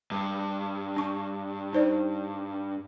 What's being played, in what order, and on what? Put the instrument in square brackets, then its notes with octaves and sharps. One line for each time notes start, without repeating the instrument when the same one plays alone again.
[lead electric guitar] G2
[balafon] D4 C#6
D#4 C5 D5